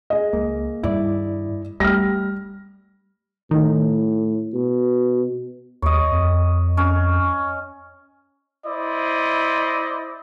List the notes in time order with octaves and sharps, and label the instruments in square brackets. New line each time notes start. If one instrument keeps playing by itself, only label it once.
[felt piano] G#4 D#5
[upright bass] C#2 [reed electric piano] A#3
[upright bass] G2 D#3 [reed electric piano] E4 D5
[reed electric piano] G3 [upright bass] A3 B3 [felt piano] F6 A#6
[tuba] A2 [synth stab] D#3
[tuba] B2
[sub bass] D#2 [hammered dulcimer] C#5 D#5
[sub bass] F2
[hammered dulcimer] C#4
[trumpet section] E4 C5 D5 D#5